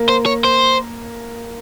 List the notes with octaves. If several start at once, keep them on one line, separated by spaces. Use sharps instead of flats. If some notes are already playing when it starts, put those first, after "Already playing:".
Already playing: A#3
C5
C#5
C5